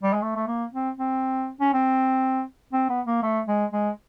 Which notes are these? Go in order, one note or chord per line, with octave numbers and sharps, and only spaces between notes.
G3
G#3
A3
A3
A#3
C4
C4
C#4
C4
C4
B3
A#3
A3
G#3
G#3